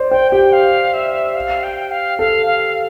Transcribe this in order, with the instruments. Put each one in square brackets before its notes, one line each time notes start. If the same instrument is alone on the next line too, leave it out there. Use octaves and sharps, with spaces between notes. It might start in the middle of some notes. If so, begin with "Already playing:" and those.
Already playing: [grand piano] C5 D5
[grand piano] C5 [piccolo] G5
[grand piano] G4 [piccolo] G5
[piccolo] F5
E5
F5
G5
F5
[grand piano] A4 [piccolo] F5
[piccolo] F5